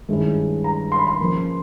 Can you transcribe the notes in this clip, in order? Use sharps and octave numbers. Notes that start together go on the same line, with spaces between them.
G2 D#3 G#3 C#4 E4
A#5
C6
B5
C6
C#3 F3 A#3